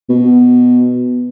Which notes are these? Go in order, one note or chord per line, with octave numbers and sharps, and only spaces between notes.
B2